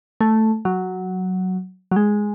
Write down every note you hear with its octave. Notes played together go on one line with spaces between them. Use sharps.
A3
F#3
F#3
G#3